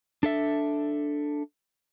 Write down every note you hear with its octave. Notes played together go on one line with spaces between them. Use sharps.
D4 A4 E5